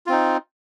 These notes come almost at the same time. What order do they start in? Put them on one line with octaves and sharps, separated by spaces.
F4 C4 D#4